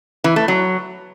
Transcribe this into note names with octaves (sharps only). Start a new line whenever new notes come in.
E3
A3
F#3